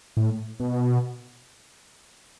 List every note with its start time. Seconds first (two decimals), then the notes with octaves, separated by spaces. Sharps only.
0.17 A2
0.60 B2